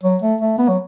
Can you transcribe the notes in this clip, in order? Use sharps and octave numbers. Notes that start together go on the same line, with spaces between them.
F#3
A3
A3
B3
F#3